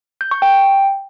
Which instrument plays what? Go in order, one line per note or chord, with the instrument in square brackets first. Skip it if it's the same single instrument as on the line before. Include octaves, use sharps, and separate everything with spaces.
[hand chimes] G6
C#6
G5